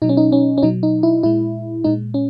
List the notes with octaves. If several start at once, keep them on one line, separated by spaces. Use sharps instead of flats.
B2 F#3 D#4
C#4
D#4
C#4
C#4
B2 F#3 D#4
D#4
E4
A#2 G#3 E4
A#2 G#3 D#4
C#4